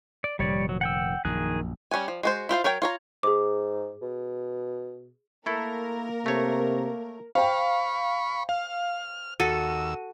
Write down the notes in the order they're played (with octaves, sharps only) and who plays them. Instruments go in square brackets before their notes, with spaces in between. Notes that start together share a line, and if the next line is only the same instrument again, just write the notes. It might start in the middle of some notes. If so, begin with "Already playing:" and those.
[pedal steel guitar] D5
[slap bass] F1 A#2 D#3 [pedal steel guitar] G3 C#5 D5
[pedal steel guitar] F#3
F#5 G5 E6
[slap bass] A#1 F#2 [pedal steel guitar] D#3 G#4 F#6
[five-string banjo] G3 C#4 F#5 G#5
F3
G#3 F#4 C5
E4 F4 C5 F5
F#3 A#4 C#5 G5
F4 C#5 A#5
[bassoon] G#2 [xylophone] G#4 D6
[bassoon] B2
[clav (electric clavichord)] A3 E4 A4 [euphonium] A#3 [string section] A#4
[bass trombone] C3 [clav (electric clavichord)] A3 C#5
[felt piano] C5 G5 [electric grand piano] F5 [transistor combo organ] B5 C#6
[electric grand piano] F5 [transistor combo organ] F6
[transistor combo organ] D#2 E6 [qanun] F#4 A4 [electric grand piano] D#7